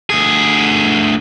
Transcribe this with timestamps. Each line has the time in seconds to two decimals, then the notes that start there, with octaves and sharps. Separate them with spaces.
0.10 D2 G#4